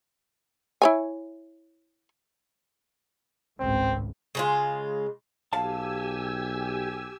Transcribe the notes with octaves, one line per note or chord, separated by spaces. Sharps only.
E4 C#5 G#5
G#1 C#2 A2 C4
C#3 G#3 F4
B1 G4 F5 G#5 A5 E6